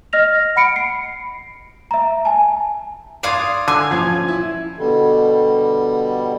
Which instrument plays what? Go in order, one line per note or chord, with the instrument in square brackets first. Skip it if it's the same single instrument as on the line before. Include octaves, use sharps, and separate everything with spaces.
[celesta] D#5 F6 A#6 F7
F#5 B5 C#7 D7
C7
E5 A#5
G#5 A5
[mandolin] D5 F5 D#6 [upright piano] C6 G#6 C7
[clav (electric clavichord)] D3 [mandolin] G#5
[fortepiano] F3 C#4 [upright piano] F4 G#6
[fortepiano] E4
[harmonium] B2 D3 G3